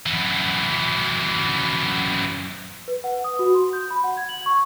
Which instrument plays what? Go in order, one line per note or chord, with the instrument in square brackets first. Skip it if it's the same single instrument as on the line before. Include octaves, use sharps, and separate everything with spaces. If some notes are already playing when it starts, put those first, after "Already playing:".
[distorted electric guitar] F#2 E3
[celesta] B4
F#5
D#6
F#4
C6
G6
B5
F#5
G#6
F#7
C#6